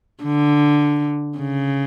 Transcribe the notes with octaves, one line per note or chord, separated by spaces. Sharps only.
D3
C#3